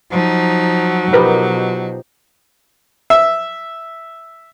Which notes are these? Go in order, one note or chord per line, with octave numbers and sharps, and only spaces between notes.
F3 F#3 D#4
B2 F3 D#4 G4 A#4 B4
E5